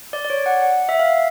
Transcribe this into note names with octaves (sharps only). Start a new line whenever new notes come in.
D5
D5
C#5
F#5
F#5
E5
F5